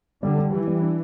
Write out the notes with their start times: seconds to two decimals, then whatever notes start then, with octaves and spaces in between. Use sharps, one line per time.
0.23 D3 G3
0.38 G3
0.52 E3 G4
0.67 G3
0.82 D4